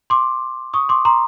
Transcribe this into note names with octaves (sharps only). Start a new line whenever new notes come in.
C6 D6
C#6 D#6
C6 D6
A#5 C6